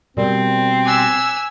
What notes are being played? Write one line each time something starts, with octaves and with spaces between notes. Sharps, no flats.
B2 G3 C4 A#4 D5
G#5 D6 E6 F#6 B6